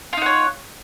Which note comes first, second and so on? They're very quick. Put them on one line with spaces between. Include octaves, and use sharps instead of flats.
F4 D#4 F#5 C#5